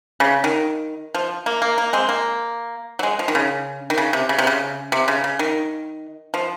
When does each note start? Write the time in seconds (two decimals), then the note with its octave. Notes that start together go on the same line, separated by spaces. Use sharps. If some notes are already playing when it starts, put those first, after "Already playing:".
0.20 C#3
0.44 D#3
1.14 F3
1.46 A#3
1.62 A#3
1.78 A#3
1.93 G#3 C4
2.09 A#3
2.99 F#3
3.03 G#3
3.19 F3
3.28 D#3
3.35 C#3
3.90 D#3
3.98 C#3
4.13 C3
4.29 C#3
4.38 C3
4.47 C#3
4.92 C3
5.08 C#3
5.24 C#3
5.39 D#3
6.34 F3